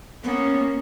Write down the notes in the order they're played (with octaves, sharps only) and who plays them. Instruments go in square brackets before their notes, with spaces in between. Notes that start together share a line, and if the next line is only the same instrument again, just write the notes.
[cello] A#3 C#4 [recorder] B3